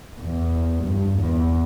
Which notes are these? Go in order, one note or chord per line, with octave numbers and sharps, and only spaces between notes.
E2
G2
E2